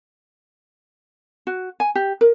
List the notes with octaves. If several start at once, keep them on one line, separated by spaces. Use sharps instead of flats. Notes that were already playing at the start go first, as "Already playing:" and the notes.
F#4
G#5
G4
A#4